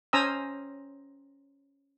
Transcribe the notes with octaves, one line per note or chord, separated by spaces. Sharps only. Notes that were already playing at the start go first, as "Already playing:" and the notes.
C#4 C5 G#5 A#5 D#6 E6